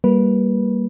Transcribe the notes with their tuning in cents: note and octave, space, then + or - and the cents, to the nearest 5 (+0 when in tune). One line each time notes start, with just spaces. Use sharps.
G3 +0 A#3 +0 B4 -15